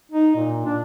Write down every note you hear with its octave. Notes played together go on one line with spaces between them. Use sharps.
D#4
A#2
D4